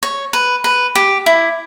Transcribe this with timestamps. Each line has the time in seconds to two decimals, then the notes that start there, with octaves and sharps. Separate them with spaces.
0.03 C#5
0.33 B4
0.64 B4
0.95 G4
1.26 E4